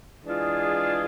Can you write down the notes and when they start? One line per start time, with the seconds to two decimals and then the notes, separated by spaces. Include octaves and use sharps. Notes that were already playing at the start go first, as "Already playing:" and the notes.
0.23 E3 G#3 D4 F4 G#4